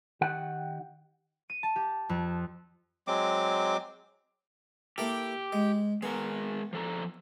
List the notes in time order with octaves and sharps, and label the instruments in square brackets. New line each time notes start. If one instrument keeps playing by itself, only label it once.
[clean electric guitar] D#3 G4 F#5
[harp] D#7
A5
G4
F2
[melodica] F#3 G#3 C4 D6
[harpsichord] A#3 E4 A4 [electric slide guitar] G4
[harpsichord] G#3
[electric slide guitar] G#3 A#4 [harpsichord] B3
[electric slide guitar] F3 A4 A#5